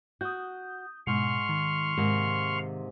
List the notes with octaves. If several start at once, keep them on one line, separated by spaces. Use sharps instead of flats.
F#4 D#6 G6
G#2 B2 C6 C#6 F6
D#3
G#2 C3 A#3